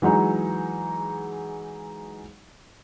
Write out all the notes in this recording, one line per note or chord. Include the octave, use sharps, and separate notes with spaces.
E3 F#3 G#3 D#4